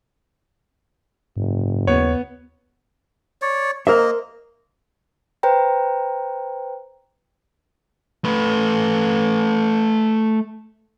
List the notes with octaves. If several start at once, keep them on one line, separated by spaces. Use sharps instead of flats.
F#1 G#2
D#2 B3 C#5
C#5 D5
A#3 A#4 C5 D#5 E5
B4 C5 G5 A#5
A3 B4